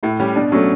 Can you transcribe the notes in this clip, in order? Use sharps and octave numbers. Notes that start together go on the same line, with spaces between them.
A2 E4
G3 C#4 G4
B2 D4
F#3 A3 C#4